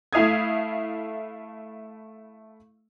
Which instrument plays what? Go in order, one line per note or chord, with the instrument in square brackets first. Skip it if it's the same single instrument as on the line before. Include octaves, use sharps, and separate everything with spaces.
[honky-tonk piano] A3 E4 F5 D#6 G#6